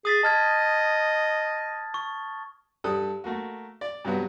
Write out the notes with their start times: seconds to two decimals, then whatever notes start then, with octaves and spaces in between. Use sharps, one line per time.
0.05 G#4 D#6 A6 B6
0.23 D#5 A5 F6 G#6
1.94 C#6
2.84 G2 G3 A4 D#6 F#6
3.24 A3 A#3 F#4
3.81 D5
4.05 G2 C3 F#3 B3